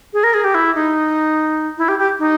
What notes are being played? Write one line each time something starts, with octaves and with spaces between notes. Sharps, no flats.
G#4
A#4
G#4
G4
E4
D#4
E4
G4
G4
D#4